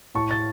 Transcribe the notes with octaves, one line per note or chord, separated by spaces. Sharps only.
A2 A5 C#6
A6